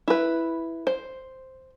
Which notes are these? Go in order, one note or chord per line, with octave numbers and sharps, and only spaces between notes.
E4 B4
C5